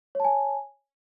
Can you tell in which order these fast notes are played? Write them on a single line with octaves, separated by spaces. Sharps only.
C#5 A5 G#5